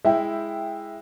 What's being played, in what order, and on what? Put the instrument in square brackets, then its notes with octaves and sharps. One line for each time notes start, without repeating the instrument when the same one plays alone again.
[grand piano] G#3 E4 [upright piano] E5 G5